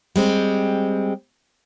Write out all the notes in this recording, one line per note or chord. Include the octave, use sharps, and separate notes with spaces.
G3 G#3 C4